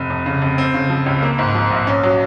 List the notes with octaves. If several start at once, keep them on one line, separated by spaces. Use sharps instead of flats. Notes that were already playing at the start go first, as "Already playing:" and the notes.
Already playing: F1
F2
C#3
F1
C4
C#3
F3
C#2
A#3
G#2
F3
A#1
C#4
F#3